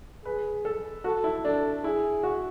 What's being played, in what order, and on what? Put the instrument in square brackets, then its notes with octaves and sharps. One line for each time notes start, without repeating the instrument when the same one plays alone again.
[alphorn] G#4 [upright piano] B4
[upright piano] A4
[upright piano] F#4 [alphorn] A4
[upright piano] E4
[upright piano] D4 [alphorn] A4
[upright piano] E4 [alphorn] G#4
[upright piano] F#4